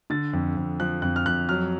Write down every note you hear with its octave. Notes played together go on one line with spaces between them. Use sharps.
D3 A6
F2
F2
F3 F#6
F2 F#6
F6
F2 F#6
F#3 F6